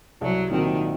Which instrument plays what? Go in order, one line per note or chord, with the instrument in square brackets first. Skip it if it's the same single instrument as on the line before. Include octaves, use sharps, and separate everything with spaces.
[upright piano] C2 [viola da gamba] F#3
[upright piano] A#2 F#3 C4 [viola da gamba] D#3